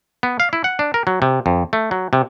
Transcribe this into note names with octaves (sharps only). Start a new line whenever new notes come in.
B3
F5
E4
F#5
D4
A#4
F#3
C3
F2
A3
F#3
C3